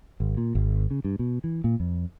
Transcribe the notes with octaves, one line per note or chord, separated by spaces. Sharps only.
G#1
A#2
G#1
C#3
G2
B2
E3
A#2
F2